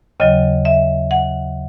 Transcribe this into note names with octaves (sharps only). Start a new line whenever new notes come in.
D#2 C#3 F#3 D#5
E5
F#5